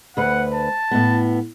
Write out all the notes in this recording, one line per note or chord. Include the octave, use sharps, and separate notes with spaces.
D2 B4 F#5
A5
A2 B3